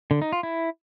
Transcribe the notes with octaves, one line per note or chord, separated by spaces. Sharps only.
D3
D#4
F4
E4